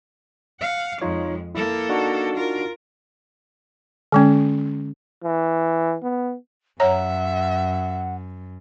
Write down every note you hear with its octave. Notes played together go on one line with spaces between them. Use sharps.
F5 F#5
F2 G#3 D#4 F4 C#5
A#3 E4 A4
D4 D#4 F#4
F4 A#4
D3 G#3 C#4
E3
B3
F#2 C#5 E5 F#5 A#5